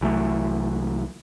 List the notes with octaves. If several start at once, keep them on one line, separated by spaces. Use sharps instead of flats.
C2 E3 F#3 A3